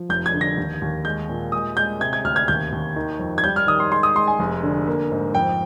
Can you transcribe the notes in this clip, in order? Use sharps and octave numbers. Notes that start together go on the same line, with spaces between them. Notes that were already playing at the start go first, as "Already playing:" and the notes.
Already playing: F3
F1 G6
G#6
D3
A#6
D#2
D#2
G#3 G6
A#2
G#3 D#6
G#3 G6
C3 G#6
G#6
D2 F6
G#6
D#2 G6
D#2
D#3
F2
G#6
G3 G6
F6
D#3 D#6
C6
G#3 C6
D#6
G#3 C6
G#5
F1
D3
A#3
G#2
F2 G5